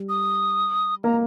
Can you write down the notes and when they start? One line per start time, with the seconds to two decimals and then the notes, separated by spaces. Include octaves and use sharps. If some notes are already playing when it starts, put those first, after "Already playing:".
Already playing: G3
0.09 D#6
1.04 A#3 A#5